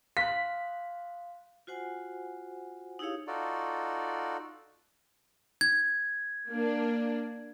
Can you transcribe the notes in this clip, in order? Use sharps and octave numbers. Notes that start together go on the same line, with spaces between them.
F5 C6 F#6 B6
F4 F#4 C5 F#5 G#5
D#4 E4 G4 G#4 C#5 F5
D#4 F4 F#4 A4 D5
G#6
A#3 D4